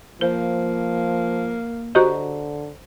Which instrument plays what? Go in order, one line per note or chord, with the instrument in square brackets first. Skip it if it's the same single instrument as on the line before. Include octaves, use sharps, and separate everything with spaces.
[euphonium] F3 [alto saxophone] A#3 [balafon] C5
[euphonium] D3 [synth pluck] F#4 G4 D#5 [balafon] C5 A#5 C#6